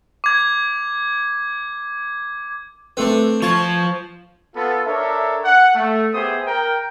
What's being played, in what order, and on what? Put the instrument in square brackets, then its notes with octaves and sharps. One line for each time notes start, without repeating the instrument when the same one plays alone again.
[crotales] D6 G#6
[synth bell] A3 A4 B4 [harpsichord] C4 D4
[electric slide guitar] F3 F4 [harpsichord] A5 [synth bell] C#6 G#6
[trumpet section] B3 F4 A4
D4 A4 A#4 C#5 E5
F#5
A3
B3 G4 G#4 C5 E5 D#6
A#4 G5